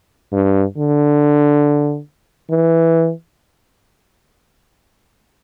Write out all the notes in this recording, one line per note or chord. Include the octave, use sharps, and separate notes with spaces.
G2
D3
E3